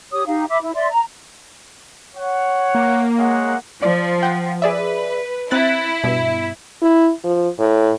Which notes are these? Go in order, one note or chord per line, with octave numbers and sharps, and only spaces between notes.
G4 C#5 D#6
D#4 G4 F5
E5 B5 D6
E4
D5 E5 C6
A#5
C#5 F#5
A#3
G#3 C#5 F#5
F3 D5
F#5 G5
G#4 B4 D5 E5
C4 E4 F#6 A6
G2 B2
E4
F3
A2